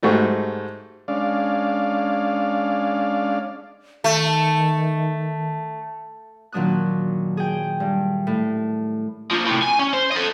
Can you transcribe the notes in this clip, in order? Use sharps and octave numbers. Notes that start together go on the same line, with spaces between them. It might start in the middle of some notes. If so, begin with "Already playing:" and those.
G#2 G3 A3 F#4
G#3 C#4 D4 D5 F5
D#3 A3
A#2 D#3 F#3 D4 D#6 F#6
G#4 G5
G2
A2
F3 A#3
A2 C3
G#5
C#4
C5
A4 D#5